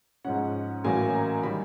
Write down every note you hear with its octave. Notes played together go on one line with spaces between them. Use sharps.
G#2 F3 G#3 C#4 F#5
A1 A2 F#3 A#3 C#4 G#5
A#5
D#3 G3 B5